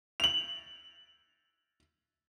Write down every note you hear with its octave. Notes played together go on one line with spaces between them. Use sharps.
F7 F#7